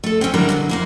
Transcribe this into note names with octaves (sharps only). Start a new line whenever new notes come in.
A3 A4
C4 C#4
D3 F#3 G3 E4 A#4 G5
B2 D3 F#3
F2 A#3 E4